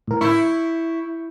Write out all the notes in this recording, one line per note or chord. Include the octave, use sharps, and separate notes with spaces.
A2 A#4
E4 C#6 G6